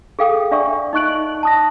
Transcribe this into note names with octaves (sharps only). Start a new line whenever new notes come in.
G#4 A4 F5 G5 D#6
D4 D5 E5 C#6
D#4 D#5 C#6 F#6 D7 F#7
A5 D#6 A#6